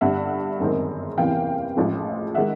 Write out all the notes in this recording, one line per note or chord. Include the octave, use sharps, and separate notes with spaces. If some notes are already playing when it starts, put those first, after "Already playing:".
G1 G2 D3 E5 F#5
G1 F#2 D#3 G#3 C4
F#1 E2 C3 E3 F5 G5
A1 A2 F3 G#3
D#3 G#3 E5 F#5